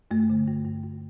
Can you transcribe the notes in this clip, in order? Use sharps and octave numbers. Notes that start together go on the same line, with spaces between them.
G2 A3
D3
G2
G2
G2